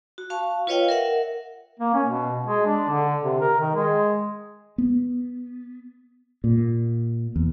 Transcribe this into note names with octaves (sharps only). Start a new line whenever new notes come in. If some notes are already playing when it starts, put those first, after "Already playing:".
F#4
F5 A5 C#6
F4 B4 C#5 D#5 F5 G5
A#4 E5 F#5
A#3
C#4
B2
G#3
D4
D3
C3
A#4
D#3
G#3
B3
A#2
E2